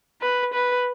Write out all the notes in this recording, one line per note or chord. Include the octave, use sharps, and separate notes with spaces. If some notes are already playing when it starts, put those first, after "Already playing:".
B4
B4